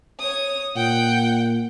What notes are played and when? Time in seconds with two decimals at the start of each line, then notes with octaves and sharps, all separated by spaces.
0.19 C#5 D#6
0.76 A#2 F#5 G5